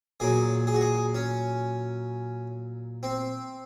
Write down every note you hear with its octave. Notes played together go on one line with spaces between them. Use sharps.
A#2 F#3 G#4
G#4
F#4
G#4
C#4
C4